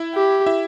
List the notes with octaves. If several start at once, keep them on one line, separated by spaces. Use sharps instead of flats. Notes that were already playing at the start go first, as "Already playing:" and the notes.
Already playing: E4 E5
G4
E4 E5